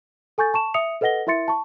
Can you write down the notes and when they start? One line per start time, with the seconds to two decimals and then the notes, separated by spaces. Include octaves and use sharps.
0.38 A4 G#5 C#6 G6 A6
0.54 A5 C#6 E7
0.74 E5 D#6 C#7 F7
1.01 A4 B4 D#5 F#5 A#6 G7
1.27 E4 A#4 E5 C6 A6 C#7
1.48 A5 C#6